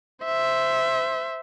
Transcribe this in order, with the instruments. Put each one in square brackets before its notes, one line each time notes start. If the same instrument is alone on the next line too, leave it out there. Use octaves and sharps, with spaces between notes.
[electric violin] C5 E5